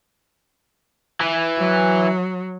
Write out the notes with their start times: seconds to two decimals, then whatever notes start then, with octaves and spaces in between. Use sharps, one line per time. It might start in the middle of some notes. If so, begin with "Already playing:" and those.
1.20 E3
1.58 F#3